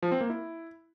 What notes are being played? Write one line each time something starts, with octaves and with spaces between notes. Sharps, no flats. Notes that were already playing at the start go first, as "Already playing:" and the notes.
F3
C4
A#3
E4